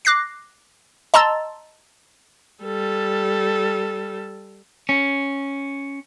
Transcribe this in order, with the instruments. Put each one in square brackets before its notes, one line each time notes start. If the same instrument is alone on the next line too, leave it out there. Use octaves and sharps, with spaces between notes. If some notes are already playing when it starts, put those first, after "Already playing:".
[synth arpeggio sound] D6 F#6 A#6 C7
D#5 A5 A#5 C6 E6 A6
[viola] G3 A4
[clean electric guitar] C#4